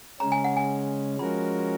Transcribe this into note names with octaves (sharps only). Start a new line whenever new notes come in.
C#3 G#3 C#4 A#5
G#5
F#5
G#5
F3 G#3 C#4 F#4 A#4 B5